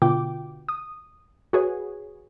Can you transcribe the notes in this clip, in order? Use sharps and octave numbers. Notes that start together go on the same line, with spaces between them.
B2 D3 F4 G5 D6
D#6
F#4 G#4 B4 C#5